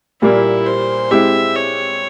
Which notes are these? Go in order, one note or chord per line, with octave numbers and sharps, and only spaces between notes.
A#2 G3 A#3 E4
C5
G#3 C4 E4 G4 E5
C#5